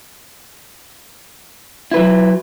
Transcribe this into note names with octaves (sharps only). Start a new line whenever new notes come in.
F#3 E4 B4